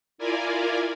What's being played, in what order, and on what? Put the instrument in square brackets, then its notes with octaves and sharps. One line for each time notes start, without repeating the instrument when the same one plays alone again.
[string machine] E4 F4 A#4 D5 G#5